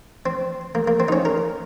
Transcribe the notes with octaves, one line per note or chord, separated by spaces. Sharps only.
C4
A#3
A#3
C4
D#4
C#4
A#4